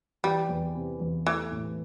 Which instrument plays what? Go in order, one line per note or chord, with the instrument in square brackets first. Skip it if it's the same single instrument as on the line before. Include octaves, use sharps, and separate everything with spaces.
[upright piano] E3 [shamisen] G3
[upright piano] E2
C3
E2
[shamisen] E3 [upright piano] A3
[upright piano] A2